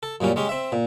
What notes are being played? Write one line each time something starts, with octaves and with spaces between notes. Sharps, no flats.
A4
F#2 A#2 G3 C#4
G#3 C#4 G4
C4 E5
A#2